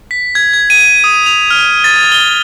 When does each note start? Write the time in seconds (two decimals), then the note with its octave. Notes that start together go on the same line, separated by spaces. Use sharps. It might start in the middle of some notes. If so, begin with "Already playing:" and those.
0.11 B6
0.35 G#6
0.54 G#6
0.70 D#7
1.04 D#6
1.26 F7
1.50 F6
1.84 A6
2.12 G7